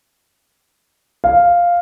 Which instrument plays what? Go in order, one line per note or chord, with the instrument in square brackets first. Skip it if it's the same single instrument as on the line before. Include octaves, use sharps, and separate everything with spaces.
[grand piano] F5